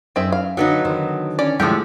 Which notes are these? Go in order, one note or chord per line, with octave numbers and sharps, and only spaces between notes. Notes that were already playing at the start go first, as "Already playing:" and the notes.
F#2 C4 G#4 E5
F5
D3 F#3 B3 D#4
D3 D#3 C5
C#4 D5
A2 C3 F3 G#3 A3 G4 G#4